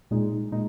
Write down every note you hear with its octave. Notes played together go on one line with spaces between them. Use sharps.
A#2 G#3 D#4
A#2 G#3 D#4